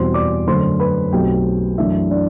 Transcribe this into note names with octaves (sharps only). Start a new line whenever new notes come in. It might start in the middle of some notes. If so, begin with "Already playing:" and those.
Already playing: E2 B2 G3 C4 C5 C6
D5 D6
F#2 D3 F#3 A3 C5 C6
B4 B5
B1 B2 A3 C4 G4 G5
F#2 E3 A3 D4 E4 E5
D4 D5